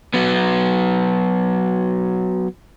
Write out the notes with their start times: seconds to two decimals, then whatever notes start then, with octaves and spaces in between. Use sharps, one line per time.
0.14 F#3 B3